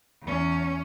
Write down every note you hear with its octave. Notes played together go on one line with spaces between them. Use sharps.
E2 C#4